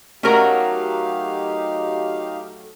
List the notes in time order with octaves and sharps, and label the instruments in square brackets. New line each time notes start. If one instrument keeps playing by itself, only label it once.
[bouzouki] F#3 A3 [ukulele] C#4 A#4 [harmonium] D#4 G4 F5